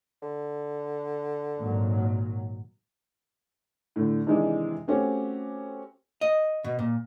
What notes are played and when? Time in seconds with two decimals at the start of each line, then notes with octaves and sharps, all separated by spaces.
0.22 D3
1.57 G#1 A#2 F#3
3.96 A2 D3
4.27 C3 D#3 E3 G#3 D4
4.88 A3 C4 C#4 F#4 G4
6.21 D#5
6.64 B2
6.79 A#2